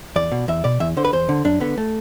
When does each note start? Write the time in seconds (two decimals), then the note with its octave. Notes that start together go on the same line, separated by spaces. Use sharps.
0.16 E2 D5
0.32 B2
0.48 E2 E5
0.64 B2 D5
0.80 E2 E5
0.97 D3 C5
1.05 B4
1.13 E2 C5
1.29 D3
1.45 F#2 D4
1.60 D3 B3
1.78 A3